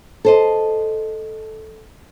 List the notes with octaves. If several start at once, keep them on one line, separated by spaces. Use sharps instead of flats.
A4 C5 D#5